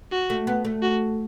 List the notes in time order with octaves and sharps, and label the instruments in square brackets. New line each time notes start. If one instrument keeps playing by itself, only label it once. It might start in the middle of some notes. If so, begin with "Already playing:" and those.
[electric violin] F#4
[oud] A3
B3
A3
[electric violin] F#4